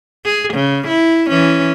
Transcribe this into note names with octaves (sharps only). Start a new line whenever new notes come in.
G#4
C#3
E4
E3 C#4